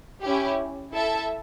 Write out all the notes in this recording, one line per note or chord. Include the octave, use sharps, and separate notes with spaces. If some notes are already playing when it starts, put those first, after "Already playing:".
C#4 E4 G4
E4 A4 E5 A5